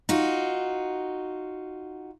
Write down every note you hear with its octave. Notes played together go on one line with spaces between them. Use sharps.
D#4 F4 F#4